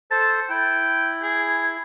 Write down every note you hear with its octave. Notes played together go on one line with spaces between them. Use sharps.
A4 C5 A5
E4 G5
G#4